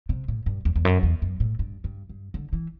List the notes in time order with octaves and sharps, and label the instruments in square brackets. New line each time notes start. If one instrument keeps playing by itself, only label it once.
[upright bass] C3
A2
G2
E2
E2
F#2
E2
F#2
A2
G2
G2
G2
D3
E3